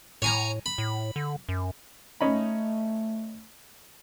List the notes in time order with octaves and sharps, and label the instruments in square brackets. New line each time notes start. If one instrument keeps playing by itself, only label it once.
[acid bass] A2 [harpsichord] C#5 G#5 A#5
[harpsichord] B5
[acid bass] A2
D3
F#2
[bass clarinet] A3 [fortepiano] C#4 D#4 B5